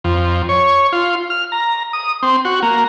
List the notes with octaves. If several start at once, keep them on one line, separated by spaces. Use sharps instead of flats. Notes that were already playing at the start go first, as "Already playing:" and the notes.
F2
C#5
F4
F6
A#5
D#6
C4
F#4
A#3